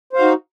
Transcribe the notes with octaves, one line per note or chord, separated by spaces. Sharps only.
D#4 F#4 C5 F5